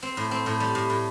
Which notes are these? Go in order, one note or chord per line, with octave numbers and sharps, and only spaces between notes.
C4
A2
C4
A2
G3
A2
A2